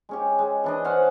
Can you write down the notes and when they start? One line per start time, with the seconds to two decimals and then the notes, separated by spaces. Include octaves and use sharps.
0.09 G#3 C#4 G4
0.39 G#3
0.64 E3 D4 D#5
0.84 C#4 C5 F5 F#5